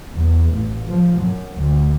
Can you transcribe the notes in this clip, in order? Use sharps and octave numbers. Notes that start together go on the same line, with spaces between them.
E2
A1
F3
F#2
D2